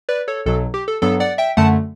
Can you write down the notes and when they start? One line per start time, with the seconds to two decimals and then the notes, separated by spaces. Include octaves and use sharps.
0.09 B4 D5
0.28 A4 C#5
0.46 B1 B2 F#3 A4
0.74 G4
0.88 A4
1.02 G2 F#3 B3 A4
1.20 D5 F#5
1.38 E5 G5
1.57 F#2 D3 A3 F#5 A5